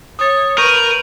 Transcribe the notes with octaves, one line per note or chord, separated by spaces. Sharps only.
C#5 D#6 A6
A#4 B4 C#6 G6 D#7